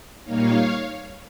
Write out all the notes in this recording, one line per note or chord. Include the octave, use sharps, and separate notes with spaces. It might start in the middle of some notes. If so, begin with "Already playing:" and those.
A#2 G3 A#3 D#4 C#5 F5